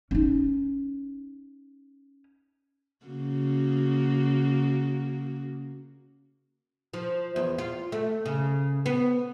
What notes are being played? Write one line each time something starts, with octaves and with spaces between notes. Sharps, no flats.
C#4 D#4
C#3 A#3 F#4
F3
E2
F4
A3
C#3
B3